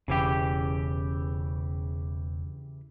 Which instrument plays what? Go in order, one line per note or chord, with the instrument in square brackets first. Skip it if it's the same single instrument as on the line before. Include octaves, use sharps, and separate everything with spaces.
[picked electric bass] E1 [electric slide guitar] C#3 E3 G4